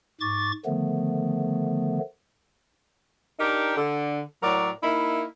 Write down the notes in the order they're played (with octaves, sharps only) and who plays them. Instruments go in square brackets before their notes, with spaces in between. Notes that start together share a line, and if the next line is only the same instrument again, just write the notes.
[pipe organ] G#2 C#6 D6 A6
D3 D#3 F3 A3 B3
[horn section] D4 D#4 G4 A#4
D3
A2 F#3 A#4 D5
A#3 D#4 E4